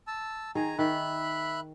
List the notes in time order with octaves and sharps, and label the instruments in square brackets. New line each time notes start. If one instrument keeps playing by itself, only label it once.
[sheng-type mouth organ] A5 E6
[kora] D#3 G#4 [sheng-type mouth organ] G#5 A#5
[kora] D#3 [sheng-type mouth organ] E5 B5 F#6